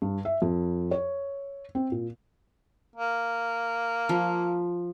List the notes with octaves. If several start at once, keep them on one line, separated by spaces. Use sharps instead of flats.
G2
E5
F2
C#5
C4
A#2
A#3
F3